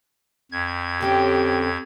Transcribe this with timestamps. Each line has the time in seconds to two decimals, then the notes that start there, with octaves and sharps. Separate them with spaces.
0.52 F2 G#6
1.01 D3 C4 C#4 G4